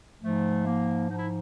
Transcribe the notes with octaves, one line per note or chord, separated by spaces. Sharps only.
G#2 F3 A3
A#3
G#2 F3 D#4
E4